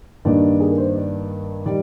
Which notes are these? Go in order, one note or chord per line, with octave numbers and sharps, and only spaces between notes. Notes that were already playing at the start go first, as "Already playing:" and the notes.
G2 D#3 A#3 D4 D5
G#4
A#4
C5
D5
D#3 G3 D5